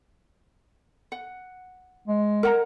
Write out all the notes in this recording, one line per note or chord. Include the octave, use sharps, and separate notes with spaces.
F#5
G#3
A#4 F#5 A#5